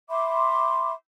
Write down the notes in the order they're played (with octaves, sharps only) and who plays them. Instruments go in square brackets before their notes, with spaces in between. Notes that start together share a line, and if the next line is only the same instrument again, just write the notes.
[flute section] E5 B5 C6 D6